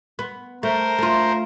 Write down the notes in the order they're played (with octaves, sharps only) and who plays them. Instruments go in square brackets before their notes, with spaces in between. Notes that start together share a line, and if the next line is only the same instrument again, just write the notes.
[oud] B3
[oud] A3 [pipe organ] A#4 C5
[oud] A3 F4